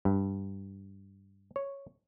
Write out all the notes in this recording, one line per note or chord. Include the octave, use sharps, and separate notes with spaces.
G2
C#5